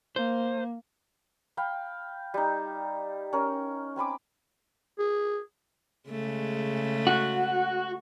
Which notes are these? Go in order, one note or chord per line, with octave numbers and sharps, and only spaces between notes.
A#3 C5
F5 G5 B5
G3 D#4
C#4 A#4
C4 G#5 B5 D6
G#4
C#3 G#3 A3
F#4